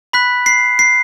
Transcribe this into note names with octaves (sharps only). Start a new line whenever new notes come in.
B5 F#6 B6
C7
C7